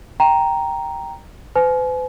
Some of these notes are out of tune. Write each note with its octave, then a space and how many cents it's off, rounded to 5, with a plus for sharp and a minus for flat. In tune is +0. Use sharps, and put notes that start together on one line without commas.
G5 +0 A#5 +0
B4 +45 G#5 +40